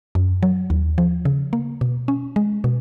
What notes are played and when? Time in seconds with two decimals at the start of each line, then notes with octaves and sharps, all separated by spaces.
0.15 F#2
0.43 F#3
0.70 D#2
0.98 F3
1.25 C#3
1.53 A#3
1.81 B2
2.08 C#4
2.36 G#3
2.64 B2